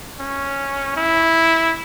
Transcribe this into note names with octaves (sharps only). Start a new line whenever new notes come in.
C#4
E4